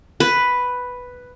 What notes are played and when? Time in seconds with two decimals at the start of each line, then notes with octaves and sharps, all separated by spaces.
0.20 B4